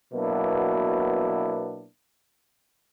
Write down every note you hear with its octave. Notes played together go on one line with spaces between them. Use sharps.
B2 F#3 A#3 B3 D4 E4